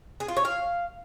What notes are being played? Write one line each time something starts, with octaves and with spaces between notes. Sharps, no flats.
G#4
F4
C#5
F5